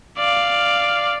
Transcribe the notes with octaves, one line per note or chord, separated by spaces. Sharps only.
D5 F5